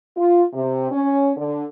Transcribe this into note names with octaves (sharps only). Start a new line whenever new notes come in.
F4
C3
C#4
D3